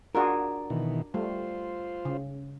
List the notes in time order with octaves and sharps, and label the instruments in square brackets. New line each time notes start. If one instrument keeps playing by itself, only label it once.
[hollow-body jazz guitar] D4 A#4 [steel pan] F4 F#4 G#4
[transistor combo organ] B2 D#3 E3
[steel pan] G3 A3 [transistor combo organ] F4 C5
[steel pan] C#3